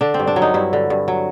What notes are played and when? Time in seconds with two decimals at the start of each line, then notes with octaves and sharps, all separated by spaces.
0.01 D3 D4
0.14 C4
0.20 G2
0.27 D4
0.36 F#3
0.42 D#4
0.54 G2 E4
0.73 D3
0.90 G2
1.08 F#3